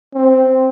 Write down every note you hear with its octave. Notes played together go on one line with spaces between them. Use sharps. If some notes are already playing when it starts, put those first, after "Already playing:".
C4